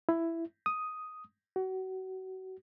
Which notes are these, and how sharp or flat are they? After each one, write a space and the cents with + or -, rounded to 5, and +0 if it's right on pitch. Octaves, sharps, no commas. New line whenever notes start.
E4 +10
D#6 +5
F#4 +30